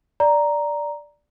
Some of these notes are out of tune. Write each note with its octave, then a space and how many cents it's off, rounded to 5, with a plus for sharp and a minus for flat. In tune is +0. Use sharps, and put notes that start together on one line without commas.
D5 +0 A#5 +0